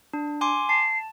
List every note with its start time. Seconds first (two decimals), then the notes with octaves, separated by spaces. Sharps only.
0.13 D4
0.41 G#5 C6 D6
0.69 A5 C7